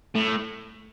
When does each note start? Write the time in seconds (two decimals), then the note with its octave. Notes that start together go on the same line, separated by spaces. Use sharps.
0.15 A2